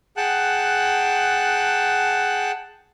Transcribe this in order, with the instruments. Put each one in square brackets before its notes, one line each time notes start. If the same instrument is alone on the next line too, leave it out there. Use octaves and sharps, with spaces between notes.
[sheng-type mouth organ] G#4 F#5 G5 A5 F#6